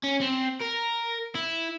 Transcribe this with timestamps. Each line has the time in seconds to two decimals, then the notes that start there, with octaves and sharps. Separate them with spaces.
0.04 C#4
0.21 C4
0.61 A#4
1.35 E4